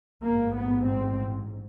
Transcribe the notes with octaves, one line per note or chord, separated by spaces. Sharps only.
A1 G#2 A#3
B3
C4